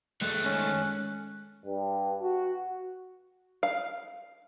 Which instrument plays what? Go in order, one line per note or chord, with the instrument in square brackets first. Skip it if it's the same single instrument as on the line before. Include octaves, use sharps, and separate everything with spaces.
[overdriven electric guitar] D#3 A3 [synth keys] G#3 [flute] F#6
[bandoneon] C#4
[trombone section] G2
F#4
[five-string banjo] F5